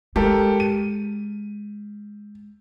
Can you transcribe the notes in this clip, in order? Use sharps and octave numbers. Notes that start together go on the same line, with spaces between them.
G#3 G4 A4 A#4
D#7